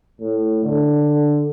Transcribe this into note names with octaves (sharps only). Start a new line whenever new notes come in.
A2
D3